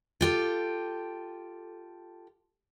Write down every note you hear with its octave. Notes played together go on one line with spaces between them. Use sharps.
F4 G4 A4